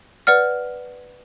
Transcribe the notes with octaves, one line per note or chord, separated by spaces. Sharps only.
B4 D5 F#5 F6